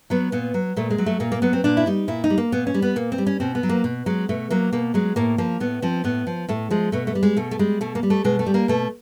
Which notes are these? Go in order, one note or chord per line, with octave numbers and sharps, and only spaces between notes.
F#3 B3
A#2 B3
F#3
A#2 A3
G#3
F#3
A3
A#2 A#3
A#3
F#3 B3
C4
A#2 D4
E4
G3 D#4
A#2 E4
D#4
G3
A#3
A#2 B3
C#4
G3
B3
A#2 A#3
C4
G3
C#4
B2 C4
B3
F#3
A#3
B2
F#3 G#3
B2 A3
F#3 A#3
B2 A#3
F#3 G#3
A2 A#3
F3 A#3
A2 B3
F3 C4
A2 B3
F3
A2 A3
F3 G#3
B2 A3
A3
G3
G#3
B2 A3
A3
G3 G#3
B2 A3
A#3
G3
A3
B2 G#3
A3
G3
A#3
B2 A3